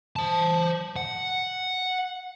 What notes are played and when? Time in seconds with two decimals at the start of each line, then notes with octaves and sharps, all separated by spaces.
0.16 C5 A5
0.96 F#5